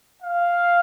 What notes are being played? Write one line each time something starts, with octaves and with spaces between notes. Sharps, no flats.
F5